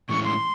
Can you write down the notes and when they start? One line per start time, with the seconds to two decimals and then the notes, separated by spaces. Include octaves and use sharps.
0.09 A2 E3 G#3 C#4 C#6
0.25 C6